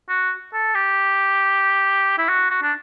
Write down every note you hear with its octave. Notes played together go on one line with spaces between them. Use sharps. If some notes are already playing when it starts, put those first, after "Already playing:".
F#4
A4
G4
E4
F#4
F#4
D4